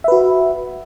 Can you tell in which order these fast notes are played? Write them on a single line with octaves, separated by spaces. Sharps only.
E5 B4 F#4